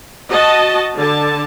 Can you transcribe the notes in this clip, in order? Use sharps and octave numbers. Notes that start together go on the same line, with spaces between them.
F#4 D#5 A5
D3 A5